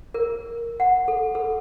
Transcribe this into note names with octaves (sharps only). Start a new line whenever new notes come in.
A#4
F#5
A4
A4